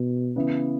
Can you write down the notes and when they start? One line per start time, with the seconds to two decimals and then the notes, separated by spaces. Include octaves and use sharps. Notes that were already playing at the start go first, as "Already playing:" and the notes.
Already playing: B2
0.36 C#3 E3 B3 E4